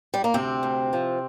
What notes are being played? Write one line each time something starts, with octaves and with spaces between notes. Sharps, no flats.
G3
A#3
D2 C3 C4
D2
F3